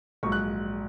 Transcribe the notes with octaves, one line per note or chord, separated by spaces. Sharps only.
A#1 G#2 F#3 C#6
F#6